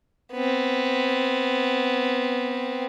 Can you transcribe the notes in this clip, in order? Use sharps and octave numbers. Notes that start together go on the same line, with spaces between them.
B3 C4